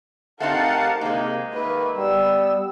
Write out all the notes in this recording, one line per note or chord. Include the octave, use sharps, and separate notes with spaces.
A3 C4 D#4 G4 A#4 F5 F#5 A5
C3 G#3 A#3 D#4
D#3 A#3 B4 E5
G3 B3 E6